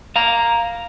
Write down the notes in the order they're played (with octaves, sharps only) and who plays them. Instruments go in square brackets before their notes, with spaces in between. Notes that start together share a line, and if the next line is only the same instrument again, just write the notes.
[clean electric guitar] F5 A#5